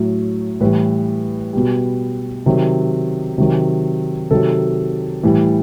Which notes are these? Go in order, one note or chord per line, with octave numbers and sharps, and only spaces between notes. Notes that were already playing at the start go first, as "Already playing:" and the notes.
Already playing: A2 F#3
A2 E3 G3 B4
B2 G3
C3 D#3 F#3
C3 D#3 F#3
C3 D#3 F#3 A4
A2 E3 G3